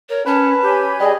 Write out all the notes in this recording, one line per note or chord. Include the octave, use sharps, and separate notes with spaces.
A#4 C#5
C#4 B4 A5
G4 C#5 G#5 B5
G3 G#4 D#5